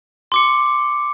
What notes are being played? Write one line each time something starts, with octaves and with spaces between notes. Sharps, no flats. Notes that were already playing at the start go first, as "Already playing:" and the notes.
C6 D6 C#7